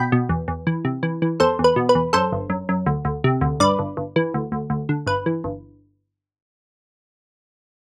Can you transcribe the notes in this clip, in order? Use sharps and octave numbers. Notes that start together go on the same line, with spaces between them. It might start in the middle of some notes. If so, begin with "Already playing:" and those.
Already playing: B2 G5 B5
B2
E2
E2
E3
C3
E3
E3
E2 A4 C5
E2
B4
B2
B4
E2
F#2 A4 C5
G1
F#2
F#2
D2
D2
C3
D2
G2 B4 D5
G1
G1
E3
D2
D2
D2
D3
G1 B4
E3
G1